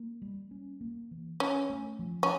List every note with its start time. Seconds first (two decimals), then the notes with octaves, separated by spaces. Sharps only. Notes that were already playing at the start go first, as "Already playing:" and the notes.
Already playing: A#3
0.22 G3
0.51 C#4
0.81 A#3
1.11 E3
1.40 C#4 D4
1.70 A3
1.99 F3
2.23 C#4